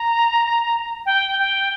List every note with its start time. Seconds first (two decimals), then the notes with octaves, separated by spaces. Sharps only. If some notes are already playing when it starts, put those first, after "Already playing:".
Already playing: A#5
1.06 G5
1.39 G5